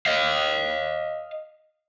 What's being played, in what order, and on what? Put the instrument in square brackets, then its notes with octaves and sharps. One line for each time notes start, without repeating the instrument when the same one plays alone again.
[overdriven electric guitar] D#5 F5